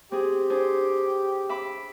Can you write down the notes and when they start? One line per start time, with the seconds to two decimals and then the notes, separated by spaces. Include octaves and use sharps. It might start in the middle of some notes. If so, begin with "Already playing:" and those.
0.12 C4 G4 G#4
0.50 D4 G#4 C5
1.49 E5 B5 D6